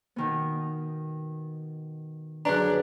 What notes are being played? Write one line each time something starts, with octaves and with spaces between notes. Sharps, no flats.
B2 D#3 B3
F#2 D3 D4 G#4 B4 C#5 A#5 F#6